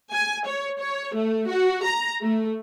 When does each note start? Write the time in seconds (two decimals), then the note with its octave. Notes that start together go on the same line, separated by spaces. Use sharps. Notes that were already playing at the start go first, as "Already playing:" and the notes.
0.12 G#5
0.47 C#5
0.80 C#5
1.15 A3
1.48 F#4
1.84 A#5
2.22 A3